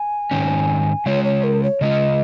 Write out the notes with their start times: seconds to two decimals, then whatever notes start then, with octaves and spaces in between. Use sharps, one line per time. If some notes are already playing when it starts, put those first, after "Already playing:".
Already playing: G#5
0.31 G#2 D#3 C#4
1.06 C#3 G#3 F4 C#5
1.24 C#5
1.44 A#4
1.63 C#5
1.81 C#3 G#3 F4 D#5